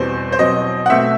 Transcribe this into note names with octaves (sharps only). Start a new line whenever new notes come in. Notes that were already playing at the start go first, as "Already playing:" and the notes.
Already playing: E2 B2 G3 C4 C5
C5
B2 F#3 C4 D#5
F#5
B2 A3 C4 E5